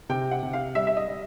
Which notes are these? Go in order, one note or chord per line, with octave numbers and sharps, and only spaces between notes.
C3 G5
F#5
C3
F5
G3 E5
E5
D#5
G3